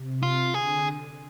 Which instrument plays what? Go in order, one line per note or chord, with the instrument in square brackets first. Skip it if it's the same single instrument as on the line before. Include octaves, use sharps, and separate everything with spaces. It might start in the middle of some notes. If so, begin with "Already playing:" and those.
Already playing: [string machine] C3
[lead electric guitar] F4
[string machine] D3 [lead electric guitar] G#4